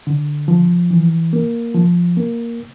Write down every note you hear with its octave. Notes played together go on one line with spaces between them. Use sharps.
D3
F3
E3
A#3
F3
A#3